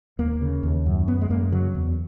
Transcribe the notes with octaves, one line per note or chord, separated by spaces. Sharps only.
D#2 A#3
C#3
D#2
F#2
F#2 B3
G#3
F#2 A#3
C#3 F#3
E2